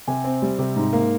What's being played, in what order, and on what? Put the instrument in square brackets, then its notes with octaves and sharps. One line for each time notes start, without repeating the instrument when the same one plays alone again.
[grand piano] C3 G#5
C4
G3
C3
G#2
A#3